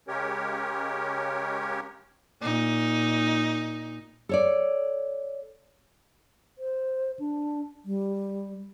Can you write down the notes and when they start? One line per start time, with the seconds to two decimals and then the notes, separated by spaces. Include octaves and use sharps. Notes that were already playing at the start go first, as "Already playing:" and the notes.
0.08 C#3 G#3 C#4 G4 A#4 C#5
2.41 A#2 D#4
4.29 A4 C#5 D5
6.58 C5
7.19 D4
7.85 G3